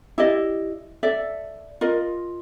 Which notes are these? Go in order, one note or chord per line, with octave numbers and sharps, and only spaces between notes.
E4 G4 D5 D#5
A4 D5 E5
F4 A#4 D#5